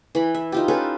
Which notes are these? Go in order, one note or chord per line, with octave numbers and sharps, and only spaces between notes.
E3 B5
E5
D#4 F4 G4
C#4 A4 B4 C#5